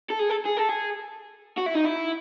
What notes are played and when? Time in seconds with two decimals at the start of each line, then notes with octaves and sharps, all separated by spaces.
0.10 A4
0.19 G#4
0.30 A4
0.46 G#4
0.57 A4
0.70 G#4
1.57 F#4
1.66 E4
1.75 D#4
1.84 E4